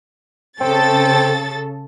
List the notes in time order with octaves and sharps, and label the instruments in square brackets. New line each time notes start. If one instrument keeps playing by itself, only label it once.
[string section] C#3 A4 A6 [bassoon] C4